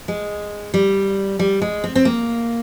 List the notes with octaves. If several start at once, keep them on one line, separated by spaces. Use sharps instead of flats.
G#3
G3
G3
G#3
C4
C4
A#3